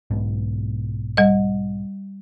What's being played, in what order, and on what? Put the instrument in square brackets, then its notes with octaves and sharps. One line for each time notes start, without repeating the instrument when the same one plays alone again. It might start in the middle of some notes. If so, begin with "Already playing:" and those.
[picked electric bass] B1 G#2 B2
[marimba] G3 D#5